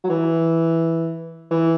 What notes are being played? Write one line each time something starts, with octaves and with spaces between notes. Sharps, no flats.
F#3
E3
E3